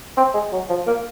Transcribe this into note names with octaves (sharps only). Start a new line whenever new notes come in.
C4
G#3
F#3
F3
A#3